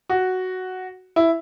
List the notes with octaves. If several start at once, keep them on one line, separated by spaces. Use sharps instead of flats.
F#4
E4